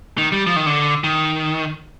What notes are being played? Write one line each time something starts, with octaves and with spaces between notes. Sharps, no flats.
D#3
G3
F3
D#3
D3
D#3